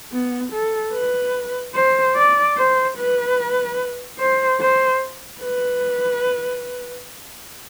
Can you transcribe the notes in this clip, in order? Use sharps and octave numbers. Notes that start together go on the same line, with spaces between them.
B3
A4
B4
C5
D5
C5
B4
C5
C5
B4